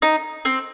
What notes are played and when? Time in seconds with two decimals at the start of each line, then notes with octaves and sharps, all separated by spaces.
0.02 D#4
0.45 C4